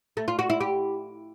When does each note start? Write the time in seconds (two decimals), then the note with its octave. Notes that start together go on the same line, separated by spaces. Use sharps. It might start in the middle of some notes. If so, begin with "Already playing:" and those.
0.17 A3
0.28 F4
0.39 F#4
0.50 E4
0.60 G4